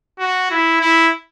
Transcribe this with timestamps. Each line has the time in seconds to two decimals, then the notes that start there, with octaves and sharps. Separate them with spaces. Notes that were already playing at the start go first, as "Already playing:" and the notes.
0.19 F#4
0.51 E4
0.81 E4